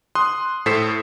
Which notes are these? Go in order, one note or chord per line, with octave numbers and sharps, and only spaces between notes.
C6 D#6 F#6
A2 A4 C5 B6 C7 E7